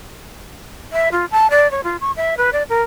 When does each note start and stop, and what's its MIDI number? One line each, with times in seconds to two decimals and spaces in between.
0.92 1.09 76
1.12 1.25 65
1.31 1.47 81
1.50 1.70 74
1.71 1.83 73
1.83 1.96 65
2.01 2.11 85
2.16 2.34 76
2.37 2.50 71
2.52 2.63 74
2.69 2.81 70